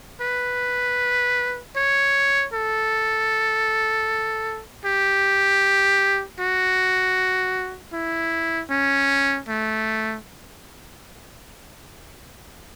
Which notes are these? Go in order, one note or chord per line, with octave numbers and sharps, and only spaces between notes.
B4
C#5
A4
G4
F#4
E4
C#4
A3